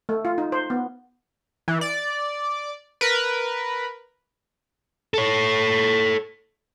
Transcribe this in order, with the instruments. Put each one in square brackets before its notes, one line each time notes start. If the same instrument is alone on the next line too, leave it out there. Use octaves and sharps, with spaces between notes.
[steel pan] A3
F4
D#4
C5
B3
[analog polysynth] E3
D5
A#4 B4
[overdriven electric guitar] A4 C#5